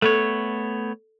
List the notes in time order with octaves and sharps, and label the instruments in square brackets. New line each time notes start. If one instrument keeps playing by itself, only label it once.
[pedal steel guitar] A3 B3 C#5 [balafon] A4